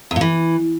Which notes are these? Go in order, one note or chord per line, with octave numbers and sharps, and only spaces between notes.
E2
A#2
E3